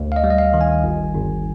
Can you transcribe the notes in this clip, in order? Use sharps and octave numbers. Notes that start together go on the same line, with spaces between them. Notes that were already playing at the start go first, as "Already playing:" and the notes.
Already playing: D2
F5
D#5
G3
D#5
F5
D#3
G#5
G1
G1